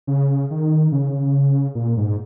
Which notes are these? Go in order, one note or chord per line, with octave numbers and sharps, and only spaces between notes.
C#3
D#3
C#3
A#2
G#2